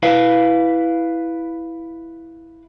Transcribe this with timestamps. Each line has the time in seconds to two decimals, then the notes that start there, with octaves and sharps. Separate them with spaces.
0.03 E4 B4 F5